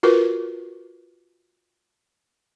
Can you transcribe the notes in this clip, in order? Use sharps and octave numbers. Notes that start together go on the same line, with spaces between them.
F4 F#4 A#4 B4